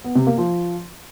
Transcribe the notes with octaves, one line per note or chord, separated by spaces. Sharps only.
B3
C3
A#3
F3